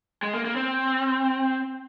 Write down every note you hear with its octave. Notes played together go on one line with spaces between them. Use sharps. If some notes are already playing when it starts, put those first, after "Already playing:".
G#3
A#3
A#3
C4